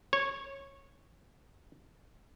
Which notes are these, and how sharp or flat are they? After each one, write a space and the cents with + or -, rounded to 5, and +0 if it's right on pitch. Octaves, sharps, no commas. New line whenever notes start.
C#5 -15